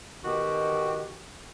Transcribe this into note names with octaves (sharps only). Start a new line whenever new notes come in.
B2 D#3 F#4 G4